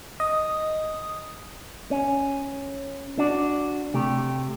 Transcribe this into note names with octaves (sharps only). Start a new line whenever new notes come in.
D#5 D#6
C#4
D4 F#4 D5
C3 A3 G4